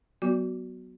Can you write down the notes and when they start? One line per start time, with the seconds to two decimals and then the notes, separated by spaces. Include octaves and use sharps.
0.22 F#3 B3 F#4